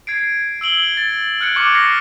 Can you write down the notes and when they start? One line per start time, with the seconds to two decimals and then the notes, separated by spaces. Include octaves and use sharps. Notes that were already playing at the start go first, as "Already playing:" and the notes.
0.07 G#6 C7 D7
0.61 E6 D7 F#7 G7
0.97 A6
1.40 F6 F#6 G#6 C#7 D7
1.56 C#6 D6 C#7
1.75 F6 A#6 C7 C#7